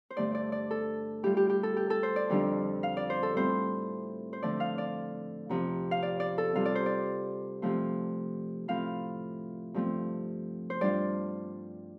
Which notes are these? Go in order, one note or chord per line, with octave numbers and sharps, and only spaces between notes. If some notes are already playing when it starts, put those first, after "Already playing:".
C5
G2 D3 A3 D5
D5
D5
A4
A2 G3 F4 G4
G4
G4
A4
G4
A4
C5
D5
F2 D3 G3 D4 F4
F5
D5
C5
A4
A2 G3 C4 F4 C5
C5
D3 F3 A3 D5
F5
D5
F2 C3 F3 C4
F5
D5
D5
A4
C3 G3 F4 F5
D5
C5
D5
C3 F3 A3 F4
A2 F3 C4 F4 F5
G2 F3 A3 C4
C5
G2 G3 D4 F4 D5